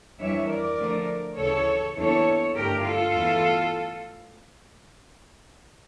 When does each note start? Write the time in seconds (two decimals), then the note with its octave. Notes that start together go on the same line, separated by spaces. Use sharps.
0.19 F2 E3 G3 D4 C#5 E5
0.48 A#4 D5
0.78 D3 F3 A3 D4
1.37 D2 C#3 E3 A4 C#5
1.95 E2 E3 A#3 D4 A4 C#5
2.55 G2 D3 A3 D4 G4 A#4
2.84 F4 A4
3.14 E2 E3 A3 E4